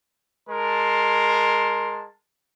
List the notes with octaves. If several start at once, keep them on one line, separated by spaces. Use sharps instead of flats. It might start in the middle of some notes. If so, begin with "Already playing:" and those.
G#3 A#4 A5 C6